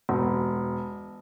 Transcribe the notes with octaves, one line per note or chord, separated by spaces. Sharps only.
E1